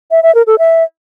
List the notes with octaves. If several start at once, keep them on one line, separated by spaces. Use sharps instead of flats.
E5
E5
A#4
A4
E5